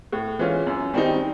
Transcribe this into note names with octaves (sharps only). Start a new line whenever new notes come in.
A2
E3 G#3 C#4 F4
F#2
D#3 G3 C4 D#4